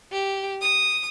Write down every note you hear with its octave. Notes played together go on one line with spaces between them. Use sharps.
G4
D#6